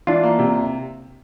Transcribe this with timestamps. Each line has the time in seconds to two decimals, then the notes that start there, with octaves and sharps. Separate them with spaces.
0.07 E3 D4 F4
0.23 A#3
0.39 C3